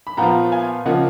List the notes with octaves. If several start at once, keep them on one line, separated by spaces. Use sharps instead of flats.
B5
A#2 F3 B3 F4 F#5 A#5
F5 G#5
C#3 F3 A#3 F4 D#5 F#5